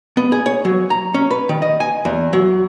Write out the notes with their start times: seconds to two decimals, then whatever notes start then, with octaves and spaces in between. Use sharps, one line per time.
0.17 B3
0.32 G#4
0.46 C#5
0.65 F#3
0.90 A#5
1.14 C#4
1.31 B4
1.49 D#3
1.62 D#5
1.80 G#5
2.05 E2
2.33 F#3